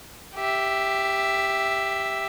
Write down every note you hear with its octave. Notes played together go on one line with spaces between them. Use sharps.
G4 E5